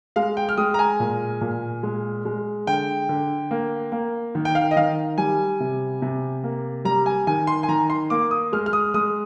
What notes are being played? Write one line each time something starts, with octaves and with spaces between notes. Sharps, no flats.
G#3 F5
G5
F6
G#3 D#6
A#5
G#5
A#2
A#2
G#3
G#3
D3 G5
D3
A#3
A#3
D#3
G5
F5
D#5
D#3 F5
G3 G#5
C3
C3
A#3
G3 A#5
G#5
D#3 G#5
C6
G#5
D#3 A#5
C6
A#3 D6
D#6
G#3 F6
F6
D#6
G#3 D#6